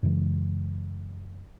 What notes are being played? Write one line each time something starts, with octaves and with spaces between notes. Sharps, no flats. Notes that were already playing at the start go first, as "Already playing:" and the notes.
F#2 C#3 E3 G#3